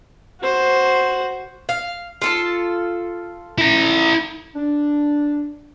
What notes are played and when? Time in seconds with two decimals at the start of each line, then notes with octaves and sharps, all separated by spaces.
0.42 F#4 C5
1.69 F5
2.22 F4 A4 A5
3.58 E4 A#5
4.55 D4